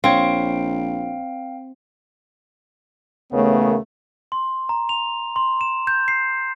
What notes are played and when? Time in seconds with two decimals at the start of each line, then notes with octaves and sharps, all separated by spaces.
0.04 A#1 C4 C#5 F5 G5
3.32 D#2 C#3 E3 A3 B3 A#4 C#5
4.32 C6
4.69 A#5
4.89 F7
5.36 C6
5.61 E7
5.87 G6
6.08 C7